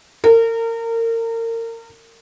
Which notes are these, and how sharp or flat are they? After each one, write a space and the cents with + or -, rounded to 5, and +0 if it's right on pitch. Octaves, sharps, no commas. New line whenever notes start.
A#4 -30